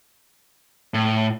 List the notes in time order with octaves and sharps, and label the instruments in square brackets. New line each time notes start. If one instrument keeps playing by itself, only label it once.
[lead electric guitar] A2